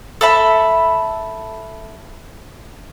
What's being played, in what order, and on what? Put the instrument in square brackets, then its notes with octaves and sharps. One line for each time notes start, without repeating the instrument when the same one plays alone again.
[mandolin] A4 E5 B5